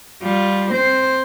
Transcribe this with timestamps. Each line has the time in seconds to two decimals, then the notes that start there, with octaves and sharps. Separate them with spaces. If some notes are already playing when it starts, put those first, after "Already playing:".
0.22 G3 F4
0.71 C4 C5